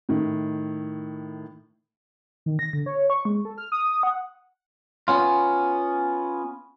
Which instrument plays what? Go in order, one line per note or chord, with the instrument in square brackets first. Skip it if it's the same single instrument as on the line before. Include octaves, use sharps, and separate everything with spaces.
[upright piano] A2 D#3
[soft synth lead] D#3
A#6
D3
C#5
C#6
G#3
A4
F6
D#6
F#5
[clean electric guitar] B3 C#4 F4